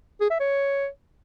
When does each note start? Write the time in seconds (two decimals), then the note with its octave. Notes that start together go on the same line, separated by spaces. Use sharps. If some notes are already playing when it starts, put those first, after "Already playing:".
0.21 G#4
0.30 E5
0.40 C#5